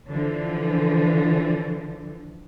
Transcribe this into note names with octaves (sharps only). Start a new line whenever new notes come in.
D3 E3 F3